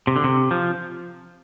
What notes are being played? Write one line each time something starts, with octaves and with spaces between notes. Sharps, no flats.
C3
D3
C3
F3